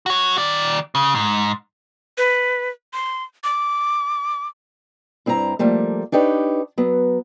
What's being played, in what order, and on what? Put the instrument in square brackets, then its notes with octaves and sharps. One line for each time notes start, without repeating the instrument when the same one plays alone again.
[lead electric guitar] F#4 C#5
D#3 D5
C#3
G#2
[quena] B4
C6
D6
[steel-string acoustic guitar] G2 C4 E4 G4 A#5
F3 G3 A3 A#3
D4 D#4 G4 B4 C#5
F#3 B3